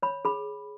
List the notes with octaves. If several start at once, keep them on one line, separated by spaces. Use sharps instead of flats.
C#5 B5
G#4 B5